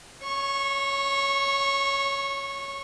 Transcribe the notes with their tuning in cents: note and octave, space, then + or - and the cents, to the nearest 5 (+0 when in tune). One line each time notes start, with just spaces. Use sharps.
C#5 +5 C#6 -20